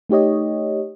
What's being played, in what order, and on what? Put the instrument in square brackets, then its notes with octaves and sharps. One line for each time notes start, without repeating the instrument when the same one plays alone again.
[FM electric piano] A3 D#4 G4 C#5 D#5